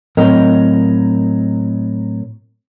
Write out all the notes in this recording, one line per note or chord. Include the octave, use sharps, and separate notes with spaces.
A2 F#3 C4 A#4 D#5 G5